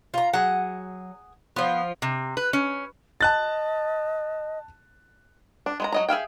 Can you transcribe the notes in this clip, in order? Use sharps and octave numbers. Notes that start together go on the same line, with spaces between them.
F4 A#5
F#3 G#4 F#5
F3 B3 F4
C3
B4
C#4
D#5 A5 F#6 A6
D4
G#3 B4 A#5
F#3 D#5 A#5
G#4 E5 F5 G5